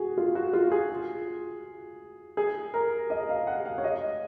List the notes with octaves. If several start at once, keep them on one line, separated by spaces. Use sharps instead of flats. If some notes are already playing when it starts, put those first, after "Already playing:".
Already playing: F#4 G#4
F4
F#4
F4
G#4
G#4
A#4
D#5
F5
F#5
F5
C#5
D#5